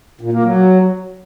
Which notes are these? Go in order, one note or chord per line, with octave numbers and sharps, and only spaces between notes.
A#2
A#3
F#3